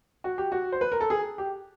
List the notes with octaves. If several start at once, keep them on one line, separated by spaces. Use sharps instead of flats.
F#4
G4
F#4
C5
B4
A#4
A4
G#4
G4